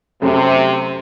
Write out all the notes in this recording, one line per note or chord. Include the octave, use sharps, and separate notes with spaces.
F#2 C3 A3